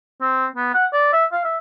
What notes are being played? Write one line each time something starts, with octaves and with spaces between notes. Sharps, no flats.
C4
B3
F#5
D5
E5
F5
E5